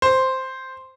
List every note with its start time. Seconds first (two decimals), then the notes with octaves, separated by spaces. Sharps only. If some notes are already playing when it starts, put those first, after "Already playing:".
0.02 C5